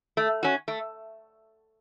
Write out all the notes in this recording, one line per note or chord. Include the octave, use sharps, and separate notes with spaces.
A3
C#4 F#4
A3